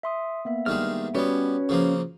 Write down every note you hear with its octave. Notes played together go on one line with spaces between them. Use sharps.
E5 C6 D#6
A#3 B3 E5
G2 D#3 G#3 F6
G3 B3 C#4 F#4 B4 C#5
C#3 F3 A#3